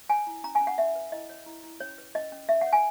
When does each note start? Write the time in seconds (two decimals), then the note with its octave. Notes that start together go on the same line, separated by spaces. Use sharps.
0.09 C#5 G#5
0.27 E4
0.44 C#4 A#5
0.55 G#5
0.61 C#4
0.67 F#5
0.78 C#4 E5
0.96 B4
1.12 E4 D#5
1.30 C#5
1.46 E4
1.64 E4
1.81 C#4 C#5
1.98 B4
2.15 C#4 D#5
2.32 C#4
2.49 C#4 E5
2.61 F#5
2.67 C#5
2.73 G#5